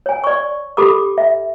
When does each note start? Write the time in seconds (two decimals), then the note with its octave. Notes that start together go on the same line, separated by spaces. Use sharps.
0.06 C#5 G#5
0.24 D5 C#6
0.77 G4 A4 B5 D6
1.18 E5